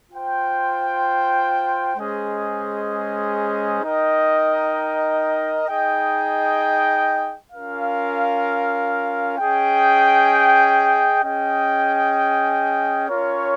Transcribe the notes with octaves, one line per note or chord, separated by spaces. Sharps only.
F4 C5 G5
G#3 C#4 G#4 C5 D#5
D#4 A#4 D#5 G5
D#4 G#4 D#5 G5
C#4 F4 A#4 F5
C#4 G#4 D#5 G5
C#4 G#4 D#5 G5
C#4 F4 A#4 C#5